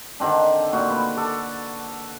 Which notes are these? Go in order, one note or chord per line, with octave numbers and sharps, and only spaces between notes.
D3 D#3 C4 D4
A#2 F#4 A#5
B4
A4 D5